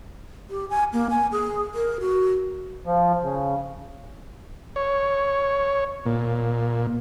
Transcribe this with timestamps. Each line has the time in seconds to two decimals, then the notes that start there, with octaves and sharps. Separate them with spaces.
0.50 G4
0.70 G#5
0.93 A#3
1.10 G#5
1.32 G#4
1.74 A#4
2.00 F#4
2.86 F3
3.23 C#3
4.76 C#5
6.06 A#2